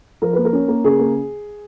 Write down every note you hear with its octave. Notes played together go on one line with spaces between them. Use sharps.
F3 A#4
A#3 B4
A#4
C#4
A#3
C#3 G#4
A#3